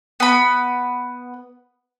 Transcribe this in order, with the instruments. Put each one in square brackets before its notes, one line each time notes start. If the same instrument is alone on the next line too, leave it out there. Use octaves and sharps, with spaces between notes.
[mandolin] B3 B5